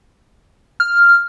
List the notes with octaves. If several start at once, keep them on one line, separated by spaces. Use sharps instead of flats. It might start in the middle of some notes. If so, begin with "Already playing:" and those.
F6